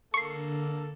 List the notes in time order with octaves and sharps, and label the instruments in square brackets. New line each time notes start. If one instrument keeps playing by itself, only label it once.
[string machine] D3 [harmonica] A#3 A4 [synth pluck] C#6 C7